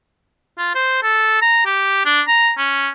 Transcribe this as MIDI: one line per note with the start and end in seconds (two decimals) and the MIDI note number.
0.58 0.71 65
0.75 1.03 72
1.03 1.40 69
1.42 1.61 82
1.66 2.02 67
2.05 2.22 62
2.28 2.52 82
2.58 2.90 61